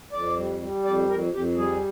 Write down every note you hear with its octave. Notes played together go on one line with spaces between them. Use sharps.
F2 D5
G3
G3
F2 D5
F2 A#4
F2 G4
G3 G#4